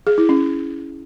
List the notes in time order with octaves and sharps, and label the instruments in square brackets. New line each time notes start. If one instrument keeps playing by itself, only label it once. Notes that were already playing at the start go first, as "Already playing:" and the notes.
[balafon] G#4
E4
C#4